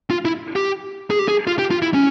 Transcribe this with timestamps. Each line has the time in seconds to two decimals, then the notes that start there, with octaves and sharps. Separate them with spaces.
0.10 F4
0.25 E4
0.56 G4
1.10 G#4
1.19 G4
1.28 G#4
1.47 F4
1.59 G4
1.71 F4
1.82 E4
1.94 C#4